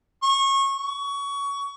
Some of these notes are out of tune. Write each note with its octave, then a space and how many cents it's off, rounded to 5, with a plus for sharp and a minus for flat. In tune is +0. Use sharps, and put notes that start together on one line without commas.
C#6 -25
C#6 +20